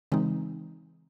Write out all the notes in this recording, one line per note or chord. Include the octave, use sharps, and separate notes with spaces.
C#3 E3 G#3 C4 D#4